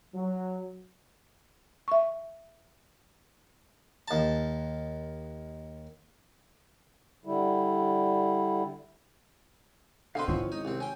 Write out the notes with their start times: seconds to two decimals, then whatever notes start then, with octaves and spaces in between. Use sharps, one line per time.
0.14 F#3
1.88 E5 C#6
4.08 D#2 A5
7.25 D3 G3 E4
10.15 B2 D3 C4 B4 F5 C6
10.28 F3 C#4 E4 C#5
10.52 G#1 D#4
10.65 C2 C4
10.80 C#4 G5